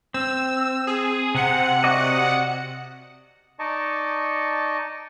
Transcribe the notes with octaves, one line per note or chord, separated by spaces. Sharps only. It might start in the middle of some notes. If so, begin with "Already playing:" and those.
C4 E6
G#4
C3 F#5 C#7
F#4 D5 D#5
D#4 D5 D#5 A5 C#6